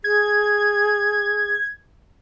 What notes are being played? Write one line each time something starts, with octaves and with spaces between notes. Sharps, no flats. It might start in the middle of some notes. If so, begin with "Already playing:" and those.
G#4 G#6